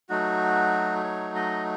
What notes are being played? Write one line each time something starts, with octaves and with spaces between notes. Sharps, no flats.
F#3 A3 D#4 F#4
C#5
D#5